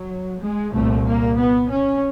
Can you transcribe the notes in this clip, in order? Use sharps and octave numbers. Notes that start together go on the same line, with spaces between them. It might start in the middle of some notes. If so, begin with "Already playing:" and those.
Already playing: F#3
G#3
C2 A#2 A3
A#3
B3
C#4